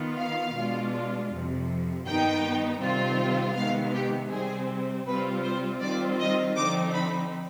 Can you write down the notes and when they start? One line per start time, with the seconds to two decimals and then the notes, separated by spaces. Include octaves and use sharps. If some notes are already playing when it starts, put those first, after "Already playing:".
Already playing: D#3 B3 F4
0.17 F5
0.54 B2 G#3 D4 F4
1.30 F2 C3 F3
2.04 G2 D#3 B3 D#4 G5
2.80 C3 D#3 G3 C4 F4
3.55 C3 D#3 G#3 B3 F5
3.93 G4
4.30 C3 G3 C4 G#4
5.06 C3 G3 C4 F4 B4
5.43 C5
5.81 D#3 G3 C4 F4 D5
6.19 D#5
6.56 D3 F3 C4 D#4 D6
6.93 B5